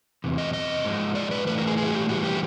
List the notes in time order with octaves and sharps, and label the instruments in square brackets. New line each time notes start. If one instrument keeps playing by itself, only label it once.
[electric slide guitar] E2 C3
D#5
D#5
G#2 F3 G#3
D5
B4
A2 E3 A3 B4
A#4
G#4
G#4
F#4
G4
A2 E3 G3 B3 F#4
G4